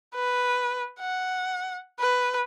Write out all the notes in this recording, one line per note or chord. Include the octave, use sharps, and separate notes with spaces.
B4
F#5
B4